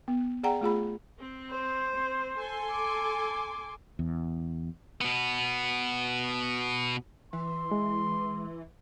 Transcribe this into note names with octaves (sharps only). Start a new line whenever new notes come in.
B3
G#4 D5 F#5 G5 A#5
A3 F4 G#4 B5
C4
C5
C4
A4 G#5 C6
D6
E2
B2 B3
E3 C6
G#3